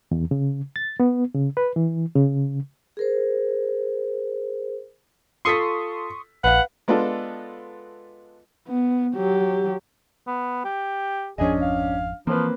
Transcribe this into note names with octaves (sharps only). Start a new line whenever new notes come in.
E2
C#3
A6
B3
C#3
B4
E3
C#3
G#4 A#4 C5
F4 A4 C6 C#6 D#6 B6
A#1 B4 F5 F#5
G#3 B3 D4 F4 A4
B3
F#3 G4
B3
G4
G#1 F2 F3 C#4 D4 G#4 D#5
F5
E3 F3 A#3 C4 B4